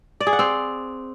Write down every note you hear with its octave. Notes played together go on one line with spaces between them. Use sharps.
D5
G#4
F#5
C4